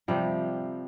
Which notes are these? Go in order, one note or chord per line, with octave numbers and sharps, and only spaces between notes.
C3 F3 G3